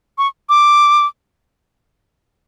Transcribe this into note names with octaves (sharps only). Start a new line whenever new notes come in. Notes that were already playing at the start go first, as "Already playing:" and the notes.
C#6
D6